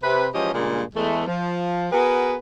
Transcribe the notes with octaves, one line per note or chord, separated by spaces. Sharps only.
C3 B4
E3 F3 G#3 C#4 G4 D#5
G2 A#2 C#3 G#3 A#3
E2 E3 G#3 A3
F3
B3 F#4 G#4 A#4 B4